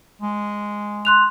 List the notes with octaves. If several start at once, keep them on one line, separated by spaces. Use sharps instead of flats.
G#3
C6 F#6 F7